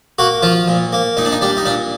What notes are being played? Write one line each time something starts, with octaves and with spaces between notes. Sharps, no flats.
A#3 F#4
F3 F4
A#2
A#3
A#2 D#4
D4
D#4
G3 D4
D#4
A#2 D4